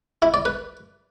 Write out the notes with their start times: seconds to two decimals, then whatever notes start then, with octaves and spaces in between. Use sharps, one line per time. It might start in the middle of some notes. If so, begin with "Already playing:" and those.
0.22 E4
0.34 D5
0.45 B4